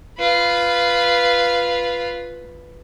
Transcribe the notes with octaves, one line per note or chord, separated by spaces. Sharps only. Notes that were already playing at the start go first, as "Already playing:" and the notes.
F4 B4